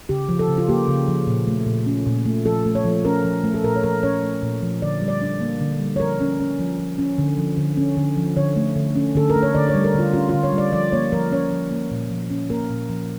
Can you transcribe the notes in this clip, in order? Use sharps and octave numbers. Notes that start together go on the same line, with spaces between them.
C#3 G4
F3
A4
C#3
F4
A#3 G4
C#3
F3
A#2
A3
A#2
C#4
A#2
A3
F3 A4
A3
C#5
F3
C#4 A#4
F3
A3
A4
A#2 A#4
C#5
F3 A#4
C#4 C#5
A3
A#2
F3
D3 D5
G3
D5
D4
A#3
D3
G3
C#5
F3 A#4
C#4
C#4
F3
F3
C#4
D3
F3
D3
C#4
D3
F3
D3 C#5
A3
D3
C#4
D3 A4
A#4
A3
C#5
D3 D5
C#5
G3
A#4
D3 F4
C#4 F4
D3 F4
C#5
G3
D5
F3 D5
A#3 C#5
F3 A#4
C#4 C#5
F3
A#3
A#2
F3
C#4
A#3 A#4
A#2
F3